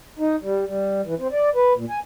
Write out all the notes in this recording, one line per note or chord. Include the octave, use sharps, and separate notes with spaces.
D#4
G3
G3
E3
C4
D5
B4
A#2
G#5